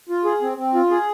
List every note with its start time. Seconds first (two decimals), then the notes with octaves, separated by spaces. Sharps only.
0.09 F4
0.25 G#4
0.42 C4
0.58 C4
0.74 F4
0.91 G#4